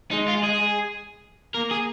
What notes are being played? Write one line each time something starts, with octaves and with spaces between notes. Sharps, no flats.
G#3 D#4
F4
G#4
A#3 A#4
G#4